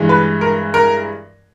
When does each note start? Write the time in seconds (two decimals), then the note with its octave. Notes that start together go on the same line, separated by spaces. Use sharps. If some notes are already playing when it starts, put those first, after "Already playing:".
Already playing: G2 E3 G#3
0.09 B4
0.41 A#4
0.74 A#4